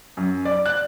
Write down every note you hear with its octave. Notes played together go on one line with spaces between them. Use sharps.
F#2
D5
F#6